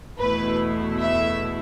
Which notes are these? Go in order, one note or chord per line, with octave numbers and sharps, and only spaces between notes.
E2 B2 A3 E4 B4
E5